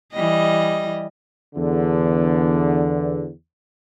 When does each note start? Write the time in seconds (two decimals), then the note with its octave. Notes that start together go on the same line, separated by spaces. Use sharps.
0.13 E3 G3 D#5
1.56 E2 D3